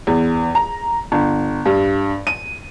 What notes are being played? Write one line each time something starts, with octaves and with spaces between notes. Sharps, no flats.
E2
A#5
G1
G2
D#7